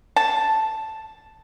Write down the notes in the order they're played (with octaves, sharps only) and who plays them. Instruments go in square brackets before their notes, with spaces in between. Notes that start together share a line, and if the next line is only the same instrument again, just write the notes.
[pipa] A5